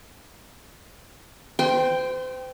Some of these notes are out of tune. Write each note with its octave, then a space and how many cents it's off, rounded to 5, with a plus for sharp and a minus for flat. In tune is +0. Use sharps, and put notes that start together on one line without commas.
C5 -35 G5 +0 C6 +15